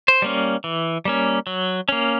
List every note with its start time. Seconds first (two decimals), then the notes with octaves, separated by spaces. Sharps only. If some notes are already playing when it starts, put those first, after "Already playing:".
0.08 C5
0.22 G3 A#3 C#4
0.64 E3
1.05 G3 A#3 C#4
1.47 F#3
1.89 A#3 C#4